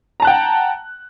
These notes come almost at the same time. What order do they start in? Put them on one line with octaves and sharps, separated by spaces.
A#5 A5 F#6 G5 F#5